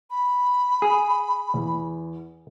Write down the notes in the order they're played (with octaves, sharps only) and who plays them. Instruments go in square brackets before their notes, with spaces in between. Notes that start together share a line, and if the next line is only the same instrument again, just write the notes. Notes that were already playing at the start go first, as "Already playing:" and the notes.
[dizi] B5
[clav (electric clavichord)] G#4
[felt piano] E2